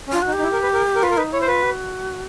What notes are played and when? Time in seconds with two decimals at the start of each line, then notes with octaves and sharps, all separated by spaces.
0.08 C#4
0.12 D4 F4
0.22 F#4
0.27 D#4
0.33 G4
0.38 D#4
0.43 E4
0.53 A#4
0.63 B4
0.73 A#4
0.96 A#4
1.03 F4 B4
1.11 A#4
1.17 D#4 B4
1.33 E4 C#5
1.41 C5
1.48 F4 B4
1.63 F#4